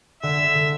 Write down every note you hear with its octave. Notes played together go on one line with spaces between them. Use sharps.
D3 E5
D3
D3